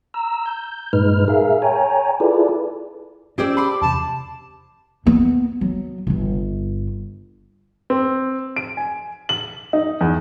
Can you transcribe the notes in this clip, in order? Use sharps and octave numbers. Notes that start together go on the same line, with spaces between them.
A#5 E6
G6
G2 A#2 G#3 D#4 B4 F6
G#4 A#4 E5 F5
C#5 G5 G#5 A#5
E4 F4 G#4 A4 B4 D5
C#4 D4 G4 G#4 C5 D5 E6
B5 C6 D6
E2 C3 A5
A#3 B3
F#3
D1 G1
C4
D7
G#5
F#7
D#4
E2